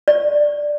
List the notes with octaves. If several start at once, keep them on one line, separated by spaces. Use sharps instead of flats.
D5